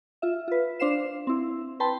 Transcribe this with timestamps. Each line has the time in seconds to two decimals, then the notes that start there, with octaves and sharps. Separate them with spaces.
0.22 F4 E5
0.48 F4 B4
0.80 D4 C5 F5 C7 E7
1.27 C4 E4
1.80 B4 G5 A5 B5 C6